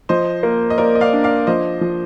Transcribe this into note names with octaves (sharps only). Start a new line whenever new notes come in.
F3 C5 D#5
A#3
D#5
A#3 A#4 D5
D#5
D5 F5
D4
D5 F5
F3 C5 D#5
F3